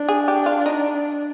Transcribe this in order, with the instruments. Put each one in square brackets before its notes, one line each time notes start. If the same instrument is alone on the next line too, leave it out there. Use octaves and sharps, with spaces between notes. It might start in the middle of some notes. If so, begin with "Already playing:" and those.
Already playing: [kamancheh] D4
[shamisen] G#4
G4
F4
D#4